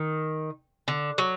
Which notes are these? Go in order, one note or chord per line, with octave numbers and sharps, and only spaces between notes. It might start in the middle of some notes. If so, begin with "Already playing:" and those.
Already playing: D#3
D3
F#3